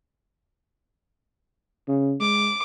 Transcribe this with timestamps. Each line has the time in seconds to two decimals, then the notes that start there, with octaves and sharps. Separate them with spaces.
1.88 C#3
2.21 G#3 D6